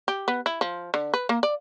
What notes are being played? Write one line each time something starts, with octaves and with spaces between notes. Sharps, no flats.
G4
B3
E4
F3
D3
B4
A#3
D5